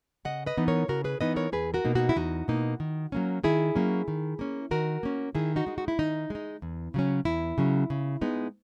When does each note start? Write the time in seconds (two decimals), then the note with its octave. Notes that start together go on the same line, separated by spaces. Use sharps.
0.25 C#3 D#5 F#5
0.46 B4 D#5
0.57 E3 B3 D#4
0.68 A#4 C#5
0.88 C#3 F#4 A#4
1.04 G#4 B4
1.21 E3 B3 D#4 B4 D#5
1.36 A#4 C#5
1.52 E2 G#4 B4
1.74 F#4 A#4
1.85 B2 A#3 D#4
1.95 D#4 F#4
2.09 E4
2.16 E2 D#4 F#4
2.48 B2 A#3 D#4
2.80 D#3
3.12 F#3 A#3 C#4
3.43 D#3 E4 G#4
3.75 F#3 A#3 C#4
4.08 D#3
4.39 A#3 C#4
4.71 D#3 F#4 A#4
5.03 A#3 C#4
5.35 D#3 E4 G#4
5.56 D#4 F#4
5.67 G#3 D#4
5.78 F#4
5.88 E4
5.99 D#3 D#4
6.30 G#3 D#4
6.62 E2
6.94 C#3 F#3 C#4
7.25 E2 E4
7.58 C#3 F#3 C#4
7.90 C#3
8.21 G#3 B3 D#4